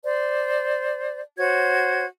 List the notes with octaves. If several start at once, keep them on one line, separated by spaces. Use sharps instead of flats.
C5 D5
F#4 C5 C#5 G#6